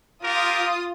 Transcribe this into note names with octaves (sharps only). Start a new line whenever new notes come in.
F4 G4 A#4 D#6